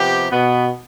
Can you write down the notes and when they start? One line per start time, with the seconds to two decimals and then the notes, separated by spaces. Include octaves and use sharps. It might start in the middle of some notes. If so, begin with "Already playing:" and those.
Already playing: C3 F3 B3 G4
0.30 B2 B3